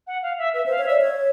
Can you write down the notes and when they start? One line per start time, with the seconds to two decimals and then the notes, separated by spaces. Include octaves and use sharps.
0.07 F#5
0.22 F5
0.38 E5
0.54 B4 E5
0.66 C5
0.70 F5
0.78 C#5
0.86 D5 E5
1.01 C#5